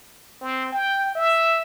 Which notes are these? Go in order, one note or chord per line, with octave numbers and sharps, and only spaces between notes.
C4
G5
E5